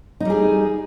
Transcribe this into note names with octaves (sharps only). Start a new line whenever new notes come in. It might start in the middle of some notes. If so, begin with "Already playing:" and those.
G3 D#4 G#4